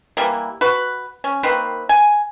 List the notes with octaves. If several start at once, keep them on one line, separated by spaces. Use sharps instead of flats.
E3 G3 A#3
F#4 B4
C#4
D#3 A#3 C4 B4
G#5